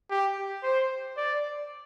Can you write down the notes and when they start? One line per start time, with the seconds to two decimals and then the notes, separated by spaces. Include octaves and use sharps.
0.10 G4
0.63 C5
1.17 D5